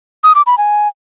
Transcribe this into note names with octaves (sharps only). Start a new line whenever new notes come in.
D#6
D6
B5
G#5